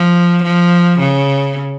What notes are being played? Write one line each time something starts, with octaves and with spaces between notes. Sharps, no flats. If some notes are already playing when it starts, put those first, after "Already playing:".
Already playing: F3
F3
C#3